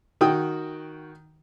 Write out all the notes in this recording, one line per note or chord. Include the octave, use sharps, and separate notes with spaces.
D#3 F#4 G5 D#6